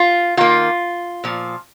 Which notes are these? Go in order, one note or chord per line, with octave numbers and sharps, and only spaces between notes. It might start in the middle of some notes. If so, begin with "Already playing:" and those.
Already playing: F4
D#3 A#3 F4
A#2 F3